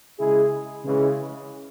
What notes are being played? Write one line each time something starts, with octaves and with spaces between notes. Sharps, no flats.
C#3 G#3 E4 G#4
C#3 E3 G#3